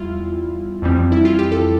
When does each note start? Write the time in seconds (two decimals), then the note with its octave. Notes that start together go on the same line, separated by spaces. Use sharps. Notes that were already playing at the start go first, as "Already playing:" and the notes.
Already playing: E2 G3 E4 F4
0.82 F2 E3 G3 C4
1.12 E4
1.25 F4
1.39 G4
1.52 A4